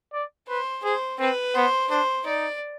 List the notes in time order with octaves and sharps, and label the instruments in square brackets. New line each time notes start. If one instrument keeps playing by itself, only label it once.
[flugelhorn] D5
[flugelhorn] B4 [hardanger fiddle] C5
[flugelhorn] G#4 [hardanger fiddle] C5
[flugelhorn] C4 [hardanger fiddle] B4
[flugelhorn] B3 [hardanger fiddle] C5
[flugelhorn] D4 [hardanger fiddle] C5
[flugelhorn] D#4 [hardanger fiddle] D5